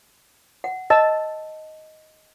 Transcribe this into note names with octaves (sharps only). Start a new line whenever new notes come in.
F#5
D#5 A5 E6